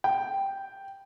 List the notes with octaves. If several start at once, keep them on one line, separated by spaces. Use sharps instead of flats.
G5